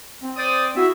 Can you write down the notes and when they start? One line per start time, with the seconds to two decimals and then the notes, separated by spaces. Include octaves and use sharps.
0.23 C4
0.37 C5 D5 D#6
0.77 E4 F#4 G#4 E5